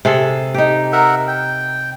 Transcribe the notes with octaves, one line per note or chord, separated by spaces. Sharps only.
C3 G#4 A4
D#4 G4
A#4 E5 F#5
G5